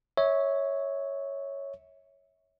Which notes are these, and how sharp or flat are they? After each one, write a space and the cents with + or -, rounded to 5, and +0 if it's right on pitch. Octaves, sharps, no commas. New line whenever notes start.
C#5 +0 E5 -25